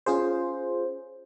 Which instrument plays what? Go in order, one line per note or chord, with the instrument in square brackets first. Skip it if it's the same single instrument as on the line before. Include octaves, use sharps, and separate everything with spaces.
[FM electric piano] C#4 F4 G#4 C5